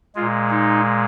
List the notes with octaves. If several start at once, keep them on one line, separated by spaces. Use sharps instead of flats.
A#2 G#3 F4
D#4